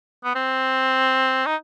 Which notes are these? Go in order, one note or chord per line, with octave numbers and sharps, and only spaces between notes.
B3
C4
D#4